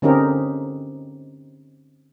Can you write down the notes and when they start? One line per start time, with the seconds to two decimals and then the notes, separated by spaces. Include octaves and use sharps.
0.02 D3 C4 C#4 D#4 G4 A#4